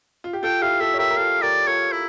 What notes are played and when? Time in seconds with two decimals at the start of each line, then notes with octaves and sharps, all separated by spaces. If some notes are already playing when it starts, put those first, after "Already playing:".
0.24 F4
0.33 G4
0.43 F4 A4 G5
0.62 E4 G4 F5
0.80 F4 A4 E5
0.94 C#5
0.99 G4 A#4 E5
1.10 A#4
1.17 F4 A4 F5
1.42 G4 A#4 D5
1.67 F4 A4 C#5
1.92 E4